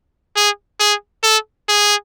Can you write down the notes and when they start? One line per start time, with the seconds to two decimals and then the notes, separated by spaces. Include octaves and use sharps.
0.36 G#4
0.80 G#4
1.24 A4
1.69 G#4